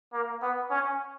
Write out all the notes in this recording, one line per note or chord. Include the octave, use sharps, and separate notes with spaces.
A#3
B3
C#4